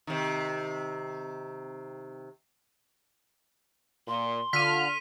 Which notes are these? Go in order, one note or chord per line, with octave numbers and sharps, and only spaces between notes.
C3 D#3
A#2 C6
D3 F4 F6 B6 D#7